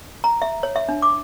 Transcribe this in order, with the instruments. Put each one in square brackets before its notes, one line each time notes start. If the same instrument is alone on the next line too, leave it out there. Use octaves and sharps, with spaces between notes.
[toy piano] A#5
E5
C#5
E5
D4
D6